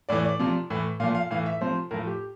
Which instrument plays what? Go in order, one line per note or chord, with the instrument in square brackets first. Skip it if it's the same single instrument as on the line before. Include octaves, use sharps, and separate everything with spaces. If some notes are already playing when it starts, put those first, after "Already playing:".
[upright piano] A2 E3 D5
D5
C3 F3
A2 E3
A#2 F5
F3
F5
A2 E3 F5
E5
C3 F3 C5
A2 F3 A#4
G4